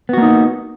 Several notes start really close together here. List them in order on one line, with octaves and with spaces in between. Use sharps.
B3 F#4 A#3 D#4